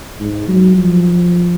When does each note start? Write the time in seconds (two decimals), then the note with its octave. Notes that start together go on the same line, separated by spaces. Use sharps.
0.20 G#2
0.48 F#3
0.77 F3